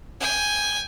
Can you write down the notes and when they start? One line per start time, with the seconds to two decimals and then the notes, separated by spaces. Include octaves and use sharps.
0.20 G5 G#5